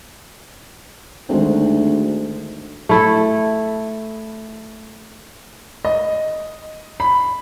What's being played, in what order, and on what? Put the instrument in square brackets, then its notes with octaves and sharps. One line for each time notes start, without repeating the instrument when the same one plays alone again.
[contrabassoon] D2 [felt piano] D#3 G#3 C4
[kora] A3 E4 A4
[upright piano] D#5
B5